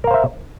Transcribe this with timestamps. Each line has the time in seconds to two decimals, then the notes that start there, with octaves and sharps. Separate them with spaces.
0.04 A#4
0.07 F5
0.11 C5
0.14 E5